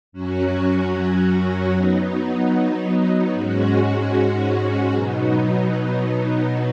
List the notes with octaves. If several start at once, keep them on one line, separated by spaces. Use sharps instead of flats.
F#2 F#3 C#4 F#4
F#3 B3 D#4
G#2 G#3 C#4 F#4
B2 F#3 B3 D#4